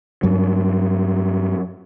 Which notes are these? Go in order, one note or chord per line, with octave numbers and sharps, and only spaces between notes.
G2 F#3